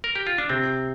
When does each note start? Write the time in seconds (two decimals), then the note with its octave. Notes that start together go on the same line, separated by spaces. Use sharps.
0.04 A#4
0.15 G4
0.27 F4
0.38 D4
0.49 C3 C4